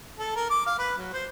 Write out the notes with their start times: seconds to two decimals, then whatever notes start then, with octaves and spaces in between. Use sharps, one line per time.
0.19 A4
0.36 A#4
0.50 D6
0.66 F5
0.79 B4
0.98 F#3
1.13 C5